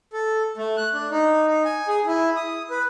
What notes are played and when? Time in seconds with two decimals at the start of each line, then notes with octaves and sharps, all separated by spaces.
0.13 A4
0.57 A3
0.77 F#6
0.94 D4
1.11 D#4
1.47 D#4
1.65 G#5
1.88 G#4
2.07 E4
2.36 D#6
2.70 B4